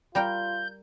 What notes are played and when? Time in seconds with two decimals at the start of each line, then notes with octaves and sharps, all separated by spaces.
0.15 G3 F4 A#4 G5 G6